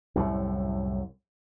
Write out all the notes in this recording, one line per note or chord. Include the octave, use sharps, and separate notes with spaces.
C2 F#2 A2